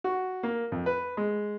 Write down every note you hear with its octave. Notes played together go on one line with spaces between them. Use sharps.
F#4
A#3
F2
B4
G#3